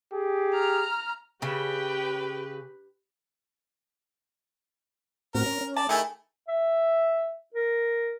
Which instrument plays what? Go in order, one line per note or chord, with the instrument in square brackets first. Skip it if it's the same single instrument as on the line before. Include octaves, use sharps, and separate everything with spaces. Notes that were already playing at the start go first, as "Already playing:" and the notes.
[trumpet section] G4 G#4
[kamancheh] A#5 F6
[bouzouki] C#3 [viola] G4 B4 [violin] G5
[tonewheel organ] A2 C4 F#4 [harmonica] A#4
[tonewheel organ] C#4
C#4
[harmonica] D5 [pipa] A5
[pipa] D#3 G#4 A4 [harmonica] A3 E4
[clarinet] E5
A#4